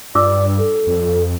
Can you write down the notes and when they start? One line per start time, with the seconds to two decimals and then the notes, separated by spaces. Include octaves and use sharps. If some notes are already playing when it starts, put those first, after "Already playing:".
0.15 G2 F4 D5 D6 E6
0.58 A4
0.87 F2